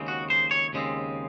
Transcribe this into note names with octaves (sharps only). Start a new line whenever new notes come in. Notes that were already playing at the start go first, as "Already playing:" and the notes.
Already playing: D#2 C#3 G#3 C4
F#4
C5
C#5
D#2 C#3 G#3 C4